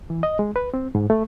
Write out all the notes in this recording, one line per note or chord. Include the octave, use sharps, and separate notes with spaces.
E3
D#5
G#3
B4
C4
G#2
A3